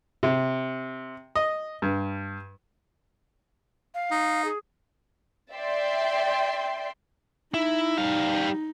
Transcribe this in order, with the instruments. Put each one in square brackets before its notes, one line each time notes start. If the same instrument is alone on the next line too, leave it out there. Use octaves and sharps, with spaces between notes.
[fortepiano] C3
D#5
G2
[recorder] F5
[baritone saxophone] D#4
[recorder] G#4
[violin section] D5 E5 G5 C6
[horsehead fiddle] D#4 [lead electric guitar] E4
[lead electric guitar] G3 F5